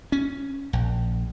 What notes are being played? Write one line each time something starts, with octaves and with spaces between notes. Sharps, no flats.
C#4
A#1